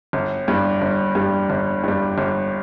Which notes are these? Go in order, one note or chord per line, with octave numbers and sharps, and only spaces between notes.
G1
G2 G3
G1
G2 G3
G1
G2 G3
G1